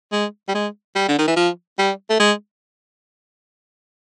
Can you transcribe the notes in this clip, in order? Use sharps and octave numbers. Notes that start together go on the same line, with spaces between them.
G#3
G3
G#3
G3
D3
D#3
E3
F3
G3
A3
G#3